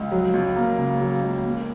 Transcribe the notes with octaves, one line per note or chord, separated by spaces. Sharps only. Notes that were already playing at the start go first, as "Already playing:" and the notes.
Already playing: C#2
F#3
C#2
A#3
C#3
F#3
C#2
A#3